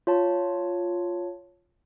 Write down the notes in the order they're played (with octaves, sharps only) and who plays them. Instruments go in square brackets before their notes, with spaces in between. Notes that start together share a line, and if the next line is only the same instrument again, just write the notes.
[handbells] F4 C#5 A5